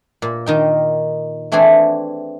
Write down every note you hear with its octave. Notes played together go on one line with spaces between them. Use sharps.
A#2
D#3 D#4 G5
E3 A3 C4 D4 G#4